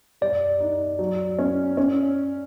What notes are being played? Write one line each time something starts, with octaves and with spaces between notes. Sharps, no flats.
G3 D5
D#4
F#3
C#4
C#4